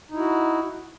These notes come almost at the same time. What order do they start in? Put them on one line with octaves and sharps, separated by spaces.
D#4 E4 F#4